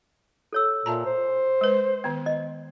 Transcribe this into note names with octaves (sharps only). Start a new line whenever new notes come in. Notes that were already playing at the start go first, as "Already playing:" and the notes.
A4 C#5 E6
A#2 E5 A5 A#5
C5
G#3 B4
D#3 B3
D#5